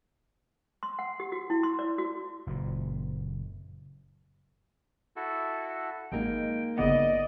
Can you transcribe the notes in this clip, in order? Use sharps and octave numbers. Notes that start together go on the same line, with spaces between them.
C6
F#5
G4
F#4
E4
C6
D5
F#4
F#1 A#2
E4 F#4 A4
G#1 G#3 A#3 D#4 G5
G1 C#3 B3 D5 D#5